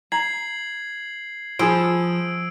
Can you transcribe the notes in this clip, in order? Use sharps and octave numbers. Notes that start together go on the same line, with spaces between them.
A#5 G#6 C7 F#7
F3 F4 G#4 B5 D#6 E6 D7